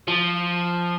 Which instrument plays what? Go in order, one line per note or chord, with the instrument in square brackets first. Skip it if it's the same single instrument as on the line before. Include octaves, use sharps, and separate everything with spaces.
[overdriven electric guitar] F3